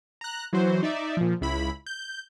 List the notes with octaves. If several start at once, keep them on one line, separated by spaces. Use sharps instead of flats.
A#5 F#6
E3 F#3 F#4 C5
D#4 D5 E5
A#2 F3
C#2 E4 B5
G6